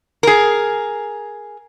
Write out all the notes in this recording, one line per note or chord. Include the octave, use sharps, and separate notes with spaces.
G#4 A#4